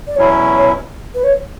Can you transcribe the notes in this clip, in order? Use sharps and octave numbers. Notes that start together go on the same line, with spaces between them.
D5
E2 B2 F#3 C#4 E4 C#5
C#5
B4
C#5